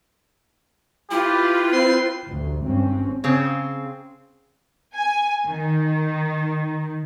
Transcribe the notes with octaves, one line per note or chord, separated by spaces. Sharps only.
E4 F4 G4 B4
C4 C6
A1 D2
G#1 G2 C4 C#4
C#3 C4 G#4
G#5
D#3